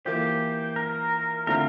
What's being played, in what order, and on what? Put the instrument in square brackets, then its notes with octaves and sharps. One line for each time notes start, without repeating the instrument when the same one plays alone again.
[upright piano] E3 A#3 F4 C5 [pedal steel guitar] G4
[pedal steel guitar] A#4
[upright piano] D3 A3 C4 F4 [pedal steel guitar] A#4